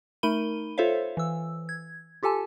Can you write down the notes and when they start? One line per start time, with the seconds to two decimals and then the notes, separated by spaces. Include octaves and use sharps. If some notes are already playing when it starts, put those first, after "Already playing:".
0.23 A3 D#4 A#4 B5 D#7 G7
0.78 F4 A4 C5 C#5 E5 F5
1.17 E3 E6
1.69 G#6
2.23 F4 G4 A4 G#5 A5